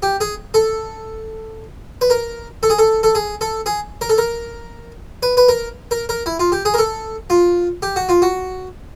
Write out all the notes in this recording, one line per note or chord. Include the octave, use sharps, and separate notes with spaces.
G4
G#4
A4
B4
A#4
A4
G#4
A4
A4
G#4
A4
G#4
A#4
A4
A#4
B4
B4
A#4
A#4
A#4
E4
F4
G4
G#4
A#4
A4
F4
G4
F#4
F4
F#4